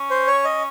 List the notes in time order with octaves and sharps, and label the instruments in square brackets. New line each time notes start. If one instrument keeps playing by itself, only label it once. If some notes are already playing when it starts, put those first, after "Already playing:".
Already playing: [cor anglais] C#4
[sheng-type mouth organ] C5
C#5
D#5